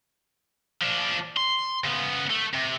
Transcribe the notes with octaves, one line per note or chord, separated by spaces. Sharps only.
F3 D4
C6
C#3 B3
A3
C3